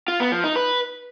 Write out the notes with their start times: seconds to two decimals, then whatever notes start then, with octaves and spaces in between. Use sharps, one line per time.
0.08 F4
0.20 B3
0.32 F3
0.44 D#4
0.56 B4